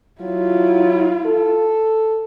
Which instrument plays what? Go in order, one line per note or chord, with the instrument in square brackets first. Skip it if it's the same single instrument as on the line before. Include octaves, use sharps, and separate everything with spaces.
[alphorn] F#3 [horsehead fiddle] E4 F4
[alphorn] A4